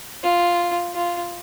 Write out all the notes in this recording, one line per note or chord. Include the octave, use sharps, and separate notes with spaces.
F4
F4